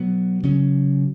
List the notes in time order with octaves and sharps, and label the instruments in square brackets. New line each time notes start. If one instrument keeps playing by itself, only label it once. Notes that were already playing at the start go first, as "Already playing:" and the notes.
Already playing: [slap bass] B2 F#3 B3
C#3 F#3 C#4